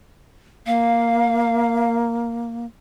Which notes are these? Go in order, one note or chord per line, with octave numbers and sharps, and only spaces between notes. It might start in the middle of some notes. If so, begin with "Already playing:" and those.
A#3 F5